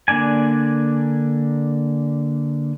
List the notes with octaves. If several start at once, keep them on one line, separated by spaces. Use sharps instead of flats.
D3 A#3 D4 D5 G#5